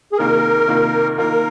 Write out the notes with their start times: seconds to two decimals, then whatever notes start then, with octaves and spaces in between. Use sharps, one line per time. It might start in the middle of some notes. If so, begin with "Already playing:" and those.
0.12 G#4
0.18 C3 D#3 A#3 F4 A#4
0.68 C3 D#3 A#3 F4
1.18 D#3 A#3 F4 A#4